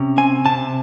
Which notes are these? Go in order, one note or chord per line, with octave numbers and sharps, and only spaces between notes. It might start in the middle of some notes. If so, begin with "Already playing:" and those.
Already playing: C3 C#4
C4 G#5
C3 A5